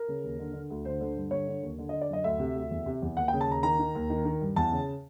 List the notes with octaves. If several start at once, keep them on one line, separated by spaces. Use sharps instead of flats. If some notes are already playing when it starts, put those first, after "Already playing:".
Already playing: A#4
C#3
D#2
D3
D3
D2
D3 C5
D3
G2
D3 C#5
D3
D#2
D3
D#5
D3
D5
F#2 D#5
D2 E5
C3
D2
E2
C3
E2
D#2 F#5
G5
C#3
A5
D#2 A#5
D#3 A#5
D#3
D#2
D#3
D#3
G2
E2 A5
C#3